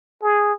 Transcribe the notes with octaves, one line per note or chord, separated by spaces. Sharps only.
G#4